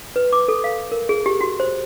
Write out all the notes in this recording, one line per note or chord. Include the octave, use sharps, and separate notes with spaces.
B4
D6
A4
F5
A#4
G#4
G4
F#4
C5